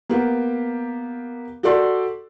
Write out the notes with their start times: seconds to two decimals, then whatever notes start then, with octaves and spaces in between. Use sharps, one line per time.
0.09 A#3 B3 G4
1.63 F#4 G4 A4 D5 C6